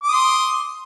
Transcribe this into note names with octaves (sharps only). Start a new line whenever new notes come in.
C6 D6 D#6